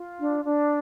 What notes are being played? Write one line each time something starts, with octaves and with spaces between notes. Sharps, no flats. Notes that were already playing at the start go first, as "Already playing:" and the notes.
Already playing: F4
D4
D4